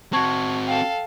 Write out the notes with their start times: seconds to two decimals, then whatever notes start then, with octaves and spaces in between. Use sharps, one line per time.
0.13 C4 F#4 A5 C#6 G#6
0.68 A4 F5 G5